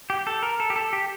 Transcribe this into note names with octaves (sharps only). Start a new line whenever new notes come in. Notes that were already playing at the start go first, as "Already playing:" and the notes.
G4
A4
A#4
A4
G4
A4
G4